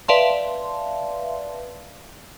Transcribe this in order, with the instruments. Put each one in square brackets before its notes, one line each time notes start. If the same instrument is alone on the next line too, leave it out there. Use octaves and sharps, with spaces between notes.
[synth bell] B4 D5 E5 F5 A5 C6